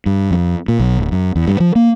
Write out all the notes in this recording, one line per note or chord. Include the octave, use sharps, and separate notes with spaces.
G2
F2
A#2
B1
D1
F#2
E2
G2
F3
A#3